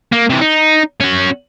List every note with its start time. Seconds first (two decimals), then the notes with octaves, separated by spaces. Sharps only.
0.12 A#3
0.30 C3 E3
0.41 D#4
1.01 C#4 F#4